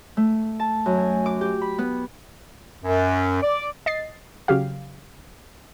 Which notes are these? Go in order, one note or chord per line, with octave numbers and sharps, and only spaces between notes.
A3
A5
F#2
G#5
D6
G4
B5
B3
F#2
D5
D#5 A6 C7
C#3 F#3 G4 F5